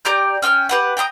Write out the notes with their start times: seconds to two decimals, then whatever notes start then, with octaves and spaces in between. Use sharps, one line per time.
0.05 G4 D5 A#5 G6
0.42 C#4 G5 C#6 F6
0.69 G4 B4 F#5
0.97 G5 A#5 B5 D#6